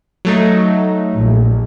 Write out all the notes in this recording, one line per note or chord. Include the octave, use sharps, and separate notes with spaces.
F#3 A3 D#4
A#1